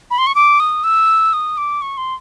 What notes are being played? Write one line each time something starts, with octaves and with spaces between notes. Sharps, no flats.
B5
C6
C#6
D6
D#6
E6
D#6
D6
C#6
C6